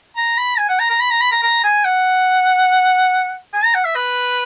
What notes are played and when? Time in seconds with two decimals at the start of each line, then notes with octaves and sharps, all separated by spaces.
0.16 A#5
0.37 B5
0.58 G#5
0.69 F#5
0.79 A#5
0.90 A#5
1.00 B5
1.11 A#5
1.21 B5
1.31 A#5
1.43 A#5
1.64 G#5
1.85 F#5
3.53 G#5
3.64 A#5
3.74 F#5
3.85 E5
3.95 B4